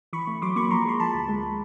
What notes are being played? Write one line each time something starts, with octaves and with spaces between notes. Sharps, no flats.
E3 B5 C#6
A3
F#3 C6 D6
A#3 B5 C#6
F3 A#5 C6
G#3 C6
F3 A5 B5
D2
G#3